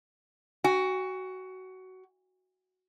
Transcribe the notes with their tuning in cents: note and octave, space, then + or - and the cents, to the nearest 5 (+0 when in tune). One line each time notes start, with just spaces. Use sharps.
F#4 +15 G#5 -40